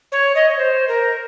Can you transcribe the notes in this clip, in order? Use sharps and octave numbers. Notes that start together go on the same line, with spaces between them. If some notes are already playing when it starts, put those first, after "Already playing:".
C#5
D#5
C#5
C5
A#4